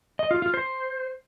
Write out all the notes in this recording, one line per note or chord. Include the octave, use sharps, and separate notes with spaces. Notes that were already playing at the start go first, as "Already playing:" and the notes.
D#5
F4
F4
C5